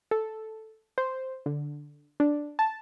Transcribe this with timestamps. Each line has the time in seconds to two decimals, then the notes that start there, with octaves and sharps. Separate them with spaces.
0.11 A4
0.98 C5
1.46 D3
2.20 D4
2.59 A5